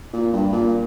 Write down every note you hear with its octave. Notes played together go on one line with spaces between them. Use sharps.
A#2
G2
A#2